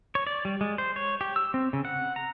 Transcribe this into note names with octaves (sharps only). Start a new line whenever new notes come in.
C#5
D5
G3
G#3
C5
C#5
G4
E6
C4
C#3
F#5
A#5